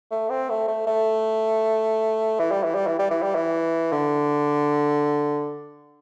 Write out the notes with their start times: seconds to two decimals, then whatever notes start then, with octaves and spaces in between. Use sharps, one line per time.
0.11 A3
0.30 C4
0.50 A3
0.68 A3
0.87 A3
2.39 E3
2.51 G3
2.64 E3
2.75 G3
2.87 E3
2.99 G3
3.11 E3
3.23 G3
3.35 E3
3.92 D3